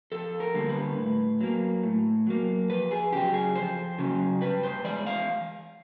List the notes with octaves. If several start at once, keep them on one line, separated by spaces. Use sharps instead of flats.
F2 A4
A#4
D3 G3 A#3
B4
A2
F#3 A#3
A2
F#3 A#3
F2 B4
G#4
C#3 F#3 G4
G#4
F2 C5
C#3 F#3
G2 B4
C5
E3 G#3 D5
F5